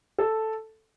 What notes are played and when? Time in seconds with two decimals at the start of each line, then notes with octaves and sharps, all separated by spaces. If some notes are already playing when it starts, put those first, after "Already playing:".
0.19 A4